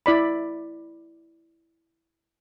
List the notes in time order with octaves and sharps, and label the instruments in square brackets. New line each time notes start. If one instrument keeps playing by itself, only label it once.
[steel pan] E4 D5 B5